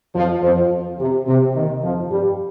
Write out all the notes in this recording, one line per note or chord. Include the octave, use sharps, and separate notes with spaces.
F2 F3
F2 F3
C3
C3
D#2 D#3
F2 F3
G2 G3